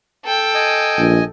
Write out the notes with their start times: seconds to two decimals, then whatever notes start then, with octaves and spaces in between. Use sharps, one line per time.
0.25 A4 G5
0.55 D#5 G#5
0.98 A#1